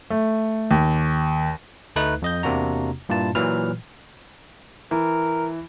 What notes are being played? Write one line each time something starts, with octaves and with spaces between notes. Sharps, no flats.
A3
D#2
D2 A3 D#4 B4 F#6
F2 D#5 G6
E2 C3 A#3 D4 F#4 A#5
G2 A#2 E4 F4 A5
A#2 E3 F#3 B4 F6
E3 A#4